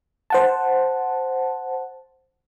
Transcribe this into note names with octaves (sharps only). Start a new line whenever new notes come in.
C5 F#5 A5